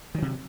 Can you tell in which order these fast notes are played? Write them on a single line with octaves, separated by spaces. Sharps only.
D#3 F#3 C3